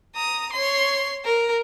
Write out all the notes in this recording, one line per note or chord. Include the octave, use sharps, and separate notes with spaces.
A#5 D#6
C#5 C6
A#4